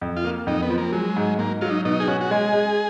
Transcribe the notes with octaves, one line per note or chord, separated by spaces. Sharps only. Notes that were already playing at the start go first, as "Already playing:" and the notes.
F2
F4
A#3
F2 D#4
B3
F3
A#3
F#3 G#3
G#2
G#2 A#3
F#3 F4
D#4
B2 D#4
G#4
C#4 F#4
F#4
G#3 G#4
G#3